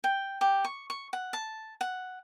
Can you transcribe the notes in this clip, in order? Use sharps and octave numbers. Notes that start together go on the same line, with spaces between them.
G5
G4
C#6
C#6
F#5
A5
F#5